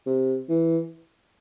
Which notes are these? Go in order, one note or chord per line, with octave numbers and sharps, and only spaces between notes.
C3
E3